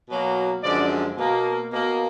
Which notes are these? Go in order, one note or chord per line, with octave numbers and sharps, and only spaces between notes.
B2 F#3 A#3
F#2 D3 F3 G#3 D5
B2 A#3
B2 A#3